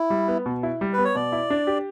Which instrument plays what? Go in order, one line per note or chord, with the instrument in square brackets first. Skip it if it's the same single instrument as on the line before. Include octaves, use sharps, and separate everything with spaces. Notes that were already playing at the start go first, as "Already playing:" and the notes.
Already playing: [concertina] E4
[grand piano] G3
B3
B2
E4
G3
[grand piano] B3 [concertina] B4
[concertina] C#5
[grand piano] B2 [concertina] D5
[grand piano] E4
D4
G4